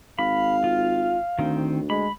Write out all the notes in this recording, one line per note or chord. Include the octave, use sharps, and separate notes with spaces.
G#1 F5 B5
F4
D2 D#3 C4
G#3 B5